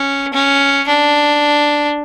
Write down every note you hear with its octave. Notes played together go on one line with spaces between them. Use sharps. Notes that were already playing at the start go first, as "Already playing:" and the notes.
Already playing: C#4
C#4
D4